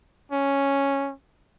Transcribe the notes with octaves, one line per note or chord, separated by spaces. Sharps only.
C#4